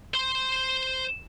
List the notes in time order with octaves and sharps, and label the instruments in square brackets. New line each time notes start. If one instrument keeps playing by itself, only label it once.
[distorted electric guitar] C5 C6